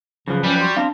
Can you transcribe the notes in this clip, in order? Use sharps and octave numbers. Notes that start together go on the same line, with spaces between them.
F#2 C#3 F3 B4
G3 C#4
F#4 C6
C4 D4 F5